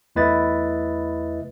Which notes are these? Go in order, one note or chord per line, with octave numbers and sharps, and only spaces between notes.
E2 A3 E4 B4 D#5 A6